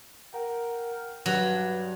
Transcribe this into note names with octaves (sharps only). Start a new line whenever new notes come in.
A#4 F#5 G5
G2 F#3